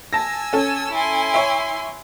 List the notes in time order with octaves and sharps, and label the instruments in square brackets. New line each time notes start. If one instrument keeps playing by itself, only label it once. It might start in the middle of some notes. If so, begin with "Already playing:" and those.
[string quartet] G#5 E6 [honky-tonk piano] A5 A#6
[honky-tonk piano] C#4 A4
[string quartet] E4 G#5 C6
[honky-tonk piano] C#5 E5